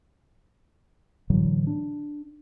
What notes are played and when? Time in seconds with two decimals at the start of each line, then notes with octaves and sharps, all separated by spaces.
1.30 A2 D3 E3 F#3
1.67 D4